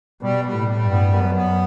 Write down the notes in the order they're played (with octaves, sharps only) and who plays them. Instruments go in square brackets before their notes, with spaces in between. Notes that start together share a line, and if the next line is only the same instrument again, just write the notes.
[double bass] B2 [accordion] G3
[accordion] G3
[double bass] A2
[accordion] G3
[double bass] G2
[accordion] B3
[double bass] F#2 [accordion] B3
[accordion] B3